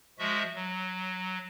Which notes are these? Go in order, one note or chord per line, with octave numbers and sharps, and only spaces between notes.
F3 G#3 F#4 E5
F#3